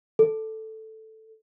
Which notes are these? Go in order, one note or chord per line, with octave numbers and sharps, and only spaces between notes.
A4